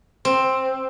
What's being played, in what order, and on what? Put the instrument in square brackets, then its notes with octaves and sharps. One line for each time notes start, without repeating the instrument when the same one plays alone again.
[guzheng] C4